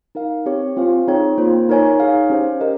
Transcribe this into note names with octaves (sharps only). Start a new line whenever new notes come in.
D#4 A#4 F5
C4 G4 C#5
C4 F4 C5 F5 G#5
C4 D#4 G#4 C#5 G5
A#3 F4 C5
D#4 A#4 C#5 G#5
D#4 G#4 C#5 F5 G#5
C#4 G4 C5 F5
G4 A#4 D#5